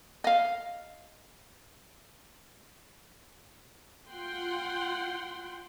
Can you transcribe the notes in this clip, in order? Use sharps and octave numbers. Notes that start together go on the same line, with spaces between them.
D#5 F5
F4 F#5 G5 C6